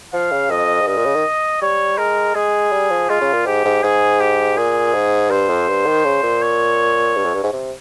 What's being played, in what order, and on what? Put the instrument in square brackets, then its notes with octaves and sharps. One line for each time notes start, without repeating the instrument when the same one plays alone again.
[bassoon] F3 [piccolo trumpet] F5
[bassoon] C#3
[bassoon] F2 [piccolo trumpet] D#5
[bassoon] G#2
[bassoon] G2 [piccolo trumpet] D#5
[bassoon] A#2
C#3
D#3
[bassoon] G3 [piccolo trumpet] C#5
[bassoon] G#3 [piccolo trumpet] A#4
[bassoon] G#3 [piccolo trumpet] G#4
[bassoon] G3
F3
[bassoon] G#3 [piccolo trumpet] F4
[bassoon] C#3
A#2
[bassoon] G#2 [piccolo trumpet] G4
[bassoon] G#2
[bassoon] G#2 [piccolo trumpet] G#4
[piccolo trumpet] G4
[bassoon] A#2 [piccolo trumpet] G#4
[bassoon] G#2
[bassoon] G2 [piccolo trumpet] C5
[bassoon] F2
G2
D#3
C#3
A#2
[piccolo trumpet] C#5
[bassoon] G2
F2
G2
G#2
C3